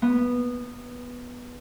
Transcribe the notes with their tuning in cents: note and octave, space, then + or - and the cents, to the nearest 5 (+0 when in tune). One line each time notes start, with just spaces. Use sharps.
B3 -10